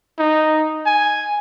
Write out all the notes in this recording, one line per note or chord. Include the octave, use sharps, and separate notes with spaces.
D#4
G#5